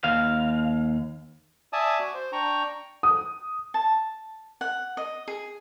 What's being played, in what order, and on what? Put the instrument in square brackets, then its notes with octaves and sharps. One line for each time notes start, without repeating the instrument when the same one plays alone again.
[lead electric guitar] D#2 F5
[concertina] D5 E5 G#5 A5 D#6
F#4 D6
C5
D4 G5 A#5 C#6
[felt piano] D#6
[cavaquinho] A5
F#5
D#5
G#4